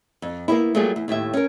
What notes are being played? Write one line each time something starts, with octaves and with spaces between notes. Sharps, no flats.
F2
A#3 B3 C#4 E4
F#3 G3 A3 A#3 F4 G#4
E2
D#2 A2 G4 E5
C#4 A#4